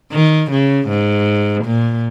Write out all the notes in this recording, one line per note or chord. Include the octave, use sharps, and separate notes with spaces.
D#3
C#3
G#2
A#2